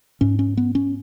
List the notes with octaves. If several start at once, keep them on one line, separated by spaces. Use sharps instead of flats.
G#2 C#4
C#4
B3
C#4